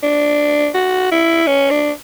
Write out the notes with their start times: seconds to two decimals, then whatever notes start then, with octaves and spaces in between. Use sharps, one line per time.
0.03 D4
0.75 F#4
1.12 E4
1.47 C#4
1.71 D4